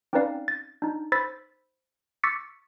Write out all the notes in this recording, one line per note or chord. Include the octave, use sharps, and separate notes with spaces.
C4 C#4 D#4 B4 D5 F5
A6
D4 D#4
C5 B5 E6 A6 B6
C#6 D6 E6 A6 B6 C#7